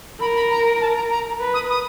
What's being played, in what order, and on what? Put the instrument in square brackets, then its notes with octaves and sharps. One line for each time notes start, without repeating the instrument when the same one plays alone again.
[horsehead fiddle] A#4 [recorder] B5
[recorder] B5
A#5
A5
A#5
A#5
[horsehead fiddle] B4
[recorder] D#6
D#6